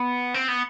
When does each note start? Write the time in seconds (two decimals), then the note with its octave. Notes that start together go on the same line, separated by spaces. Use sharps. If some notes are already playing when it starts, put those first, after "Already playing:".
Already playing: B3
0.34 C4
0.48 B3